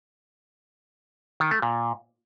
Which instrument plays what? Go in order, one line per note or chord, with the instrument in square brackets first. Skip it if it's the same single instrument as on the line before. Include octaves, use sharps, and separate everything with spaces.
[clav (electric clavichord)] D#3
A3
A#2